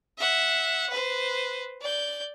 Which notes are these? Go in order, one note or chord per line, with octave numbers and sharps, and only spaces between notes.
E5 F#5
B4 C5
D5 G6